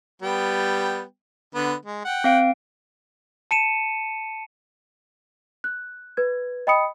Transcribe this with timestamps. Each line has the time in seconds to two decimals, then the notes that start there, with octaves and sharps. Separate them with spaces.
0.22 G3 B3 G5
1.55 D3 B3
1.85 G#3
2.05 F#5 G5
2.24 C4 F5 D7
3.51 A5 C#7 D#7 E7
5.64 F#6
6.17 B4 G#6
6.67 D#5 G5 B5 D#6 C#7